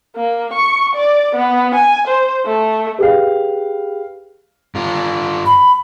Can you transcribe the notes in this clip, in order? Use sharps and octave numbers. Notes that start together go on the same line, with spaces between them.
A#3
C#6
D5
B3
G#5
C5
A3
G4 G#4 B4 F5 G5
G2 F4
B5